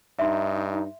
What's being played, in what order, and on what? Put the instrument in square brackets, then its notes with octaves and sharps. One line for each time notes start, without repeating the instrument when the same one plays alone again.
[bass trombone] G2 [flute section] D#4 [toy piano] E5 C6